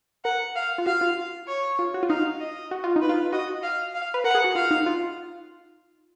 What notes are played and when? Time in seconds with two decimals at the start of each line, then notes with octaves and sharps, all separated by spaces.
0.24 A#4 F#5
0.55 F5
0.78 F4
0.86 F#4 F5
1.01 F4
1.48 C#5
1.79 F4
1.94 F#4
2.03 F4
2.09 D#4 F5
2.40 D#5
2.71 F#4
2.84 F4
2.96 D#4
3.01 B4
3.09 F4
3.32 F#4 D#5
3.63 F5
3.94 F5
4.14 B4
4.24 A#4 F#5
4.35 G#4
4.44 F#4
4.55 F4 F5
4.71 D#4
4.86 F4